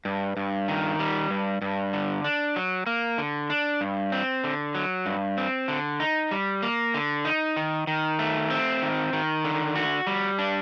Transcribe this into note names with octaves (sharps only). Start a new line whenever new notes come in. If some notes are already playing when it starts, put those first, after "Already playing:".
G2
G2
D#3
G3
G2
G2
D3
D4
F#3
A#3
D3
D4
G2
C4
D3
F#3
G2
C4
D3
D#4
G3
A#3
D3
D#4
D#3
D#3
A3
C4
D#3
D#3
D3
F#4
G3
D4